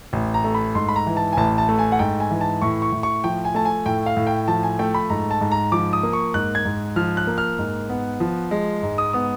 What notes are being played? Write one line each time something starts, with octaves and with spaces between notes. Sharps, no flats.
A1
A#5
A3
B5
G#2 C6
B5
A#5
E3
A5
G#5
A1 A5
A5
A3
G#5
F#5
G#2 G5
G#5
E3
A5
A2 C#6
C#6
A2
C#6
F3 G5
G#5
A3 A5
G#5
A2 G5
F5
A2
G5
F3 A5
G#5
A3 G5
B5
G#2 A#5
A5
G#2
A#5
F3 D6
D#6
A#3
C#6
G#2 F#6
G#6
G#2
F3 F6
F#6
A#3
F6
G#2
B3
F3
G#3
G#2
D#6
B3 D#6